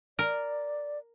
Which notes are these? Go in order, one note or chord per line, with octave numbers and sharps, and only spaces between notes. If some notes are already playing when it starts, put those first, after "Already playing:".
A#4 D5